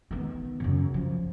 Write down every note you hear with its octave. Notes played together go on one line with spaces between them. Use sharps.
D#3 B3
F#2 C#3
F3